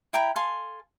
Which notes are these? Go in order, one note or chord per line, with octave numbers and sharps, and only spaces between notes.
E4 G5 A#5 B5
A4 F5 G#5 C6